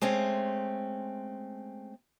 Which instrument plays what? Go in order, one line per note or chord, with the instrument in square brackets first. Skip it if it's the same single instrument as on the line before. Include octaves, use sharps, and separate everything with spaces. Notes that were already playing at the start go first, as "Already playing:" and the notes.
[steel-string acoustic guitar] G#3 A3 C4 C#4